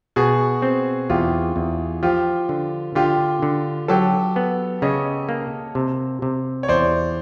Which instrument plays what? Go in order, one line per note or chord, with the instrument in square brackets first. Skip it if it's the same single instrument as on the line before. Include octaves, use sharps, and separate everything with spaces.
[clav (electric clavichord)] B2 [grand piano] F#4 G#4
[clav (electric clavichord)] C4
[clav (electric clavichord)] E2 [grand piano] F4 G4
[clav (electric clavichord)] E2
[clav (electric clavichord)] F3 [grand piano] F4 G4
[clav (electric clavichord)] D3
[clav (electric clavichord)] D3 [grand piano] F4 G4
[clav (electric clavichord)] D3
[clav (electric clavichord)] F#3 [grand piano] G4 A4
[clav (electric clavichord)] B3
[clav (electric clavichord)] C#3 [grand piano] C#5 D#5
[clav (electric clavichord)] A#3
C3
C3
[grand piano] C#5
[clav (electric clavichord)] E2 [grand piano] C5 D5